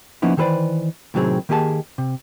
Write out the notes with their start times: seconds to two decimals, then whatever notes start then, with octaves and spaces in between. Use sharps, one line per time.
0.22 F3 A#3 B3 C#4 D#4 E4
0.37 D#3 E3 A4 B4 C5 D5
1.14 A2 C3 D#3 F#3 C4 G#4
1.49 D#3 A#3 G4 G#4 A5
1.98 C3